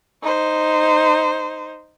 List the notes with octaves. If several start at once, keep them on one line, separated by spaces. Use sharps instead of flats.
D#4 C5